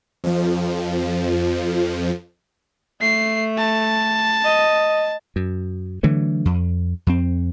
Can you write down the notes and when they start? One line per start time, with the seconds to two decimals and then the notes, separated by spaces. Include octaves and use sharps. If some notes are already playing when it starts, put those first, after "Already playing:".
0.24 F2 F3
3.01 A3 C7
3.58 A5
4.44 D#5
5.36 F#2
6.03 D3 E3 F#3 A3
6.45 F2
7.07 F2 C4